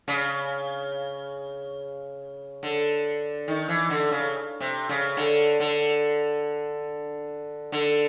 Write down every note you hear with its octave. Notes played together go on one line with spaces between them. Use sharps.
C#3
D3
D#3
E3
D3
C#3
C3
C#3
D3
D3
D3